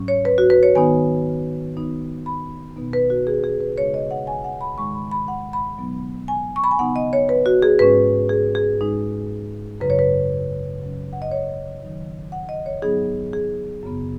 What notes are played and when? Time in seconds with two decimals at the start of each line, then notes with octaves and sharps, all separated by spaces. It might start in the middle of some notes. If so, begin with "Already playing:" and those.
Already playing: G#2 F#3 C#4
0.08 C#5
0.25 B4
0.38 F#4
0.50 B4
0.63 C#5
0.75 D#3 B3 D#4 G#5
1.76 D#3 B3 D#4
2.26 B5
2.76 B2 B3 D#4
2.93 B4
3.10 F#4
3.27 G#4
3.44 G#4
3.60 B4
3.77 C#3 G#3 D#4 C#5
3.94 D#5
4.11 F#5
4.27 G#5
4.44 F#5
4.61 B5
4.78 G#2 D#3 G#3 D#4 C#6
4.94 B5
5.11 B5
5.28 F#5
5.53 B5
5.78 B2 F#3 B3 D#4
6.28 G#5
6.56 C#6
6.64 B5
6.71 G#5
6.79 C#3 B3 D#4 F#5
6.96 D#5
7.13 C#5
7.29 B4
7.46 F#4
7.62 G#4
7.79 G#2 G#3 C#4 B4
8.29 G#4
8.55 G#4
8.80 G#2 G#3 D#4
9.80 F#2 C#3 F#3 D#4 B4
9.90 C#5
9.99 B4
10.81 C#3 F#3 C#4
11.13 F#5
11.22 D#5
11.31 C#5
11.82 D#3 F#3 D#4
12.32 F#5
12.49 D#5
12.66 C#5
12.82 G#2 F#3 B3 D#4 G#4
13.33 G#4
13.83 F#2 C#3 B3